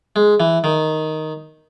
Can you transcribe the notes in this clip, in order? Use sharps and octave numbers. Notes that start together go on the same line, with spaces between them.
G#3
E3
D#3